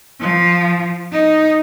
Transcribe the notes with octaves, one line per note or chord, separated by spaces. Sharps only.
F3
D#4